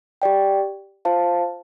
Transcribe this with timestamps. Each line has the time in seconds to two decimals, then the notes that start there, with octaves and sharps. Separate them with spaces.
0.22 G4 D5 G5
1.05 F4 C5 F5 A5